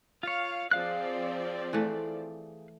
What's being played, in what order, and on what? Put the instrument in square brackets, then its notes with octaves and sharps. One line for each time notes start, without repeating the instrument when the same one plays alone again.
[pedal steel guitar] F4 C#5 [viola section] F5
[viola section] F3 C4 D5 [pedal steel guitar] G#4 F5 F#6
[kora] E3 A3